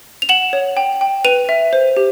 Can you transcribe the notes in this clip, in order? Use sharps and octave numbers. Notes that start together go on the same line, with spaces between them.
F7
F#5 E7 F#7
C#5
G5
G5
B4 D#7 F7
E5
C5
G4